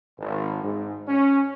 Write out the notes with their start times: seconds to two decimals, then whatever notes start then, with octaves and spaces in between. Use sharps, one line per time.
0.18 G#1
0.62 G#2
1.08 C#4